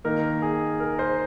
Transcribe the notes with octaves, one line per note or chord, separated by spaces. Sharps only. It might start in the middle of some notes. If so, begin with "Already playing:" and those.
D#3 A#3 D#4 A#4
G#4
A#4
C5